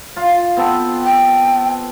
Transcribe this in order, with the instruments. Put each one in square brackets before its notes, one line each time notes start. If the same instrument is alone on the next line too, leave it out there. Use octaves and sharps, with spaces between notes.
[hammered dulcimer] F4 F5
B3 C4 A4
[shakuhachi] G5